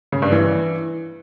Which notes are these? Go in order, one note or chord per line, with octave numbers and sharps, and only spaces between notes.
C#3
G2
E3